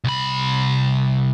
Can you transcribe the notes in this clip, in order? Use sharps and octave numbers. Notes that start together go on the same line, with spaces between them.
C2 B5